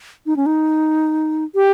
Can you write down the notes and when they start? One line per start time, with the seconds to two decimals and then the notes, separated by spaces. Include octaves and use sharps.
0.26 D#4
0.36 C#4
0.46 D#4
1.55 G4